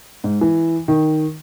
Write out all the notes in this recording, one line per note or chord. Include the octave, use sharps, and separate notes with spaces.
G#2
E3
D#3